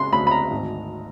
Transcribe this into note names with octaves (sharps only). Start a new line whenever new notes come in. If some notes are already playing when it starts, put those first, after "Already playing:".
Already playing: C#3 C6
D2 B5
B5
A#5
G#1